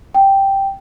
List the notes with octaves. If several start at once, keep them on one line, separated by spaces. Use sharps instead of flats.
G5